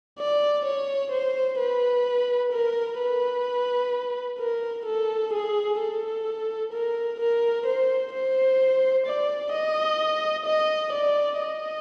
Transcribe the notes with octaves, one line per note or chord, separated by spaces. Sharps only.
D5
C#5
C5
B4
A#4
B4
A#4
A4
G#4
A4
A#4
A#4
C5
C5
D5
D#5
D#5
D5
D#5